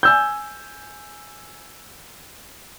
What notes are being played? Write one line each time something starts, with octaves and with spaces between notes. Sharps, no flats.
G#5 E6 G6